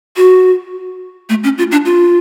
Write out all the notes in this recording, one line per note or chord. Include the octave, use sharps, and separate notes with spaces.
F#4
A3
C#4
F4
D4
F4